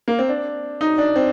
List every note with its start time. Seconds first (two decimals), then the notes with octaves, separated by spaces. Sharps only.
0.08 A#3
0.19 C4
0.29 D4
0.81 D#4
0.98 D4
1.16 C4